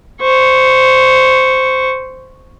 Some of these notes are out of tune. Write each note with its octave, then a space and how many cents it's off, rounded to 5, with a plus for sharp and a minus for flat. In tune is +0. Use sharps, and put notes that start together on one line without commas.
C5 -10 C#6 +0